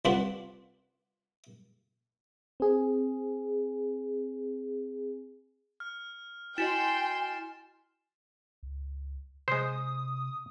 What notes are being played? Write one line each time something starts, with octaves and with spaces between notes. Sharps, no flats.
C2 D4 F4 B4 F#5
C4 G#4
F6
E4 F#4 D#5 G5 G#5 C6 A6 E7
C#2
C3 G#3 C5 D#6